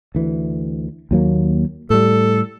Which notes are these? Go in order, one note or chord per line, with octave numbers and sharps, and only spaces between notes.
D2 E3
D#2 F#3 A#3
A2 G3 A4